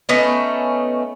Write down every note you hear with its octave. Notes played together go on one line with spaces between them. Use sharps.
A3 B3 C#4 D#4